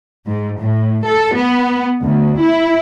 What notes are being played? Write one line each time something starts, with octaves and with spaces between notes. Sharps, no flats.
G#2
A2
A4
B3
D2
E4